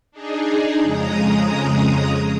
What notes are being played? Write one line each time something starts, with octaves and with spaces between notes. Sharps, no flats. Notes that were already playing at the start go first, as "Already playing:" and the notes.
D4 D#4 G#4
F2 C#3 G#3 A#5 D#6